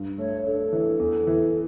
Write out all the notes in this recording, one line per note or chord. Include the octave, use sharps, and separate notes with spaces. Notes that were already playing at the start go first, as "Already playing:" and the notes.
Already playing: G2
A3 C#5
D4 A4
E3
E2
E3